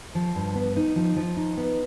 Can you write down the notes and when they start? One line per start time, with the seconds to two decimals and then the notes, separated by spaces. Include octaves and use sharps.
0.15 F3
0.35 G2
0.55 B3
0.76 D#4
0.96 F3
1.16 F3
1.37 D#4
1.57 B3